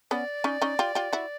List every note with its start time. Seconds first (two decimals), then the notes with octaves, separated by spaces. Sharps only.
0.11 B3 C#4 D5
0.44 C#4 D#4
0.61 C#4 D#4
0.79 F4 G4
0.95 F4 G4
1.13 E4 F#4